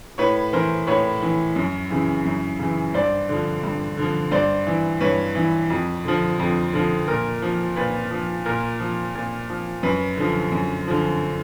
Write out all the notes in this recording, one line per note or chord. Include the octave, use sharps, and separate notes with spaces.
A2 B4 C#5
E3 A#4 C5
A2 B4 C#5
E3
F#2
C#3 E3
F#2
C#3 E3
G2 C5 D5
D3 F3
G2
D3 F3
G2 C5 D5
E3
G2 B4 C#5
E3
F2
D3 F3
F2
D3 F3
A#2 A#4
F3
A#2 B4
F3
A#2 A#4
F3
A#2
F3
F#2 B4
D3 F3
F#2
D3 F3